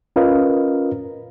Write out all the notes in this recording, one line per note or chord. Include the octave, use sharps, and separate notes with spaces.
C#4 F4 A#4 B4 D#5 F5